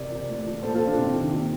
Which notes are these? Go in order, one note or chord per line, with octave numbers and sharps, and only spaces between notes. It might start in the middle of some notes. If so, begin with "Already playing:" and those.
Already playing: C3 A#4 D5
F3
A2
F3
A#2 A4 C5
F4 A4
F3
D4
C3 C4
D#3
A#2